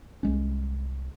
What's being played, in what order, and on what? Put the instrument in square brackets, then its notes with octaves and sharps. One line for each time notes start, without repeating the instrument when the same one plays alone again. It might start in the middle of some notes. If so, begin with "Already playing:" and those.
[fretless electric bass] C2 G#3 C#4